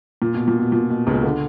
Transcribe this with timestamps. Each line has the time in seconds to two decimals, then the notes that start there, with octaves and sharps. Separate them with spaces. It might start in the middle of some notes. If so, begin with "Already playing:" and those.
0.22 A#2
0.34 B2
0.48 A#2
0.59 B2
0.72 A#2
0.90 B2
1.07 C#2 C#3
1.23 D3